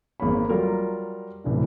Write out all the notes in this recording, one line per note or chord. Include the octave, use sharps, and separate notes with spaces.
G#1 A#3 G#4 C#5 B5
F#3 G3 F4 A#4
D1 C2 E3 D4